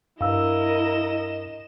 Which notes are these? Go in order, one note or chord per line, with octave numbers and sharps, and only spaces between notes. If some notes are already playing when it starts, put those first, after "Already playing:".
G2 E4 A#4 D#5 F5 E6 E7